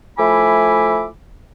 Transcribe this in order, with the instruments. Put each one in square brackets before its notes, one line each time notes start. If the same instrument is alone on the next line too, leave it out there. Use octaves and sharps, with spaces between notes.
[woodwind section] F3 A3 E4 G#5 B5 D6